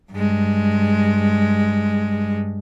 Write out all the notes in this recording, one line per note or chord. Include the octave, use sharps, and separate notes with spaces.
G2 G#3